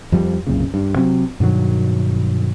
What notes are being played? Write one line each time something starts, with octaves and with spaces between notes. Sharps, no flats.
F2 F3 G3
C2 F#2 A#2 C#3
G2
C3 F#3
G2 B2 D#3 F#3